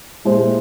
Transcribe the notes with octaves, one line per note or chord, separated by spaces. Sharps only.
A#2 G#3 E4 G4 C5